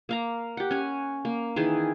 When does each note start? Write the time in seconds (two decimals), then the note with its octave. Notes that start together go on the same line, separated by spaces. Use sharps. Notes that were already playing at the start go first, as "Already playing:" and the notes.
0.09 A#3 F5 A#5
0.57 G4 F#5
0.71 C#4 G#5
1.25 A#3
1.56 D#3 E3 G#4